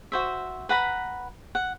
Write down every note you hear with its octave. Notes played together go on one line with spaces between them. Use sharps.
F#4 C5 E5
B4 F#5 A#5 B5
F#5